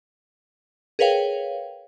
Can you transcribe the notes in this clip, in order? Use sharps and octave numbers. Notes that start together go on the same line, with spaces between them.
G#4 A#4 B4 C#5 F5 G5